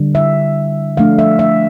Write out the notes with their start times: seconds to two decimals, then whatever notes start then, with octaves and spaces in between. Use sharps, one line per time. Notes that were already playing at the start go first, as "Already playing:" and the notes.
Already playing: D3 G3 D4
0.15 E5
0.97 F3 A3 D4 F5
1.19 E5
1.39 E5